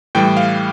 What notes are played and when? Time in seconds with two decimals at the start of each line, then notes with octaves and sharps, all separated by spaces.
0.15 A2 E3 G3 G5
0.37 F5